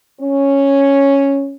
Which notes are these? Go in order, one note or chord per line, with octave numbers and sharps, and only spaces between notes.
C#4